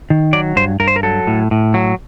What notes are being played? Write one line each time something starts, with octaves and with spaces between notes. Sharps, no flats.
D#3
F#3 D5
G2 C5
G2 A#4
C5
A#4
F#3 A4
A2
A2
F#3